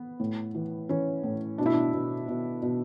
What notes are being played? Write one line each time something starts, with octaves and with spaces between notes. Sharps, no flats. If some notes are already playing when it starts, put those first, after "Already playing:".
Already playing: B3
A2
E3
E3 C#4
A2
B2 D4
E4
D4
B2
B2
B2